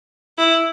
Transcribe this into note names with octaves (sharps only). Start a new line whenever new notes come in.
E4